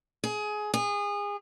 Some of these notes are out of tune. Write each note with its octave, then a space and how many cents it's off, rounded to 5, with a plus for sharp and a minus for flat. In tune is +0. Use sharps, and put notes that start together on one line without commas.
G#4 +20
G#4 -25